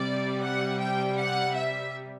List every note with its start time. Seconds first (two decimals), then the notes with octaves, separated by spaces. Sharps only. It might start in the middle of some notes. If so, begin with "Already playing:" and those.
Already playing: C3 G3 D5
0.43 F#5
0.79 G5
1.17 F#5
1.54 E5